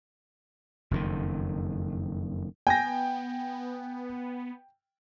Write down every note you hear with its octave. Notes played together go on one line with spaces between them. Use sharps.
F#1 F2 A#2 D#3
B3 G5 G#5 G6 A#6